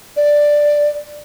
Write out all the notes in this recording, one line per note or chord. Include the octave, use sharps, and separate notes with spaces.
D5